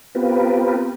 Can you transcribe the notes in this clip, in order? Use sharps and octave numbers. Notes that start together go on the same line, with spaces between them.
B3 C4 F4 G4 A#4 B4